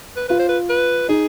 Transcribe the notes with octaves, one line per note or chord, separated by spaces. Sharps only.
B4
F4 B4
C5
B4
B4
D#4 G#4